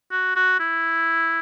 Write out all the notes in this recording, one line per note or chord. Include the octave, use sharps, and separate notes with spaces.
F#4
F#4
E4